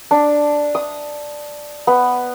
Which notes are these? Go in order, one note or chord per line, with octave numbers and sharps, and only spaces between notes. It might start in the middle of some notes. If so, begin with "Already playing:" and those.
D4
D#6
B3